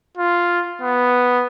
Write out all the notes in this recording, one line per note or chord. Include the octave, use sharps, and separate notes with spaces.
F4
B3